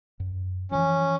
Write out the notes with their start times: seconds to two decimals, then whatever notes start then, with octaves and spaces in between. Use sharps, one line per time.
0.20 F#2
0.71 E3 F3 C#4